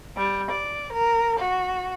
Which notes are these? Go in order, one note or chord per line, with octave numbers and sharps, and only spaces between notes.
G3
D5
A#4
F#4